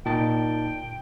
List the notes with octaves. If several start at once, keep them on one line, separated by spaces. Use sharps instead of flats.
A#2 D#4 G5 A5